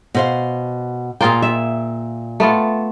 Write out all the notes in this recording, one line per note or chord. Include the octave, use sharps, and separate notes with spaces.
B2 C5 F5
A#2 A#3 F4 G#4 G5
E5
A3 B3 F4